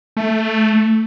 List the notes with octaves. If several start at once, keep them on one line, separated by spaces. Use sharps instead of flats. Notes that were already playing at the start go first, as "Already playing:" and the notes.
A3